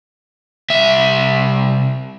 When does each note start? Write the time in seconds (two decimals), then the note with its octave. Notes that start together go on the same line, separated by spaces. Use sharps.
0.70 C2 E5